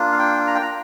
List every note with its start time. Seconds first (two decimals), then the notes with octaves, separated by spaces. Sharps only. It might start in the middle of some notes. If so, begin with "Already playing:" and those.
Already playing: A#3 D4 F4
0.12 F5
0.19 G5
0.47 A#5
0.55 G5
0.62 A#5